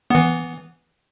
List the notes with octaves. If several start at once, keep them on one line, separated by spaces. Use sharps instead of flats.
E3 B3